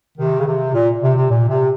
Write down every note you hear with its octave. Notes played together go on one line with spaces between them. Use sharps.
C3 D#3
C#3
C3
A#2
C3
C3
A#2
C3